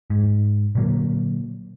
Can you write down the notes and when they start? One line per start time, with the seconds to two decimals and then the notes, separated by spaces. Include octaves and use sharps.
0.10 G#2
0.75 A#2 D3 F#3 A#3